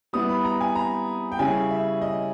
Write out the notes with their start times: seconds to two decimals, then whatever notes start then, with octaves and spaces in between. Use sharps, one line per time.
0.13 G3 B3 E4 D#6
0.29 B5
0.44 A#5
0.61 G#5
0.75 A#5
1.32 G5
1.39 C#3 G3 C#4 E4 G#5
1.71 E5
2.01 D#5